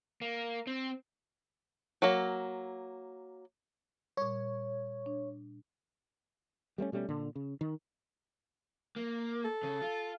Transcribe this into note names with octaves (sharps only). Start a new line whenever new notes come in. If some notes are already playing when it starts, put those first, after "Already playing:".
A#3
C4
F#3 A#3
A#2 G3 C#5
D4
G3 A3 B3 C#4
B2 G3 A3 C#4
A#2 D3
C#3
D#3
A#3
A4
C#3
F4